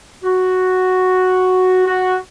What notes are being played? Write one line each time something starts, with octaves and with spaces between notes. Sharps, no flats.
F#4
F#4